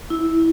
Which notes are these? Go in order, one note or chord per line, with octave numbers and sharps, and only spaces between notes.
E4